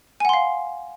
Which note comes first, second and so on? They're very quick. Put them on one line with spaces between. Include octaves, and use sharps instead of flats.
G#5 F#5 C6 F5